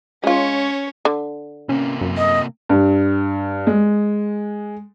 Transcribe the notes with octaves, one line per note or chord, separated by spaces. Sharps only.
G#3 C#4 F4 C#5
D3
C3 A#3 C#4
F#2
D#5
G2
G#3